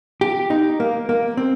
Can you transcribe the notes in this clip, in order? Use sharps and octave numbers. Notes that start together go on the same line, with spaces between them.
G4
D#4
A#3
A#3
C4